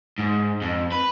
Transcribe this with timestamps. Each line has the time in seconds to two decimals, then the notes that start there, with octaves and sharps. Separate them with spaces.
0.19 G#2
0.62 F2
0.92 B4